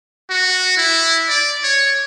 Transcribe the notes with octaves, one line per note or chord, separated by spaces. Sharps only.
F#4
E4
D5
C#5